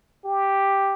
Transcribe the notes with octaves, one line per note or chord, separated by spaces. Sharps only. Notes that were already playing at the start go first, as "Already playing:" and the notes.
G4